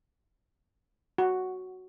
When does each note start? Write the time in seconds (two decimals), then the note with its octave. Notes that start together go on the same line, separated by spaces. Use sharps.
1.18 F#4